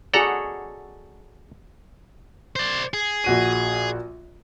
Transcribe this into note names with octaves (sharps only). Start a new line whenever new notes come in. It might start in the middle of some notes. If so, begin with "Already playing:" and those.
F#4 G#4 A4 D5 F#5 A#5
C5 D5
G#4
A#1 F#4 D#7